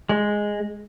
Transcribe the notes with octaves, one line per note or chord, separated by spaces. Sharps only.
G#3